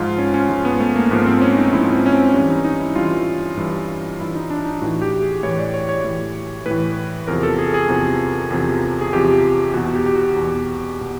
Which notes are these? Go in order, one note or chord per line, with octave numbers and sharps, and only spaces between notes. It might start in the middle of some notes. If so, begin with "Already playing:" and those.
Already playing: G#2 F3 F4
C#4
C#4
G#2 F3
B3
A3
A#3
G#2 F3 B3
C4
C#4
D#4
G#2 F3 E4
C4
C#4
C4
G2 C#4
E3
D#4
D#4
E4
G2 E3 F4
G2 E3
G2 E3 E4
D#4
D4
D#4
A2 E3 F#4
G4
G#4
A2 E3 C#5
D5
C#5
C#5
A2 E3
A2 E3 B4
E2 C3 F3 A#4
A4
G#4
G#4
E2 C3 F3
E2 C3 F3
G#4
E2 C3 F3 G4
E2 B2 F#4
G4
G4
F#4
E2 B2
B2